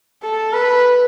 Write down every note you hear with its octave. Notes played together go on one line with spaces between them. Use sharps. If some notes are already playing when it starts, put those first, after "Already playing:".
A4
B4